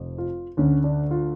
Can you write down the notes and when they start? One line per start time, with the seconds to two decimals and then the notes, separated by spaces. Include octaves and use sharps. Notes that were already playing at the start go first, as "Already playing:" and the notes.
Already playing: F1 F2
0.18 F4
0.57 D2 D3 C#4
0.84 D4
1.11 F4